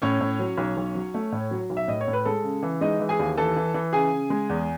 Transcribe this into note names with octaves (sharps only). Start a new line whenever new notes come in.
A2 C#4 C#5
A2
F#3
B1
B1
F#3
A3
A2
F#3
B1
E5
A2 D#5
C#5
A2
B4
G#3 A4
C#3
E3
G#3 D#4 D#5
E3
G#4 G#5
D#2
E3 A4 A5
E3
E3
C#3 G#4 G#5
C#3
G#3
E2